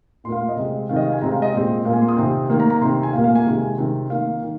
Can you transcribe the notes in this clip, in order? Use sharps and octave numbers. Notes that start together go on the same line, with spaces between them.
A#2 C6
A#3 F5
F5
D#5
C3 G#3 C4
C3 D#3 C4 F5
D#5
F5
G#5
C3 G#3 C4 A#5
F5
D#5
A#2 G#3 C4 D#5
A#2 A#3 F5
G#5
C6
D#6
C3 D#3 C4
D#3 A#3
A#5
A#5
C3 D#3 C4 C6
G#5
A#2 A#3 F5
F5
G#5
C3 D#3 G#3
C3 D#3 C4
D#3 A#3 F5
D#3